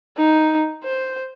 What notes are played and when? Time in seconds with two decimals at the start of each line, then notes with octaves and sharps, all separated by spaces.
0.17 D#4
0.84 C5